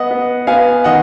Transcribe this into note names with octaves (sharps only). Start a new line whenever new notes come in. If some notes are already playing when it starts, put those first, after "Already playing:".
Already playing: B3 D#5 F#5
B3
B3 F5 G#5
D#3 D#5 F#5